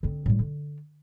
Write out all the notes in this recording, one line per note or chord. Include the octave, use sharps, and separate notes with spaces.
D3 C4
A2 G3
D3